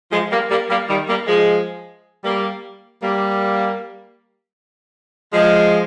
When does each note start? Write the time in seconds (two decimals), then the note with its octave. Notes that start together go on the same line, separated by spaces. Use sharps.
0.12 F3 G#3
0.31 G3 A#3
0.50 G3 A#3
0.70 G3 A#3
0.89 D#3 G3
1.09 G3 A#3
1.28 F3 G#3
2.24 G3 A#3
3.02 G3 A#3
5.33 F3 G#3